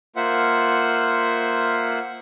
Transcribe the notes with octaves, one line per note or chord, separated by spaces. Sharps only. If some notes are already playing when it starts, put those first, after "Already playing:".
A#3 F4 C5 E5 F#5